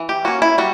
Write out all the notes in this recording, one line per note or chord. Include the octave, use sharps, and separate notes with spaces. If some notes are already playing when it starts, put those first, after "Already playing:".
Already playing: E3
G4
A#3 C#4 F#4
E4
G3 F#4